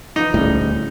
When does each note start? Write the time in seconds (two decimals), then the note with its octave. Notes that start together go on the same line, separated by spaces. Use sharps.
0.16 E3 F3 D#4 F5
0.34 D#1 D2 A2 G3 C#4 G#4